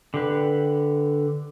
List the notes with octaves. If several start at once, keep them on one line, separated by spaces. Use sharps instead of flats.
D3 G4 B4